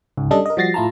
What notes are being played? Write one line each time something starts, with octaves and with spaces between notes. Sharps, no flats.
C#2 G#2
G3 C#4 D4 A4 D#5
A#4 D#5
F3 G3 F#4 A6 A#6 C7
A2 E4 F4 A5 A#5